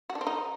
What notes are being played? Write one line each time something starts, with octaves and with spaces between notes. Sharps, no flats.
F#4
D4
C4
D#4